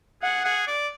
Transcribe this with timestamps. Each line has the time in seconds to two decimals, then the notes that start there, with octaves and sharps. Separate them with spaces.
0.23 G#4 F#5
0.44 G#4
0.67 D5